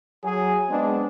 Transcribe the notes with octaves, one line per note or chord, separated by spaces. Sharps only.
F#3 G#4
G#3 B3 C4 D4